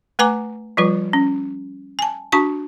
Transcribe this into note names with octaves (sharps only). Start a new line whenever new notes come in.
A3 B4 G#5 A#5 D6
F3 G3 F4 B4
C#4
G#5 A5
D4 F#4 A5 C#6